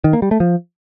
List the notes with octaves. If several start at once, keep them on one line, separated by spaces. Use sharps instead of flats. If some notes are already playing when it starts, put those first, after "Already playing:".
D#3
A#3
G3
A3
F3